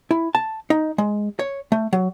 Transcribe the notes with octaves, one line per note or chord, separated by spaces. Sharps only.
E4
A5
D#4
G#3
C#5
A3
F#3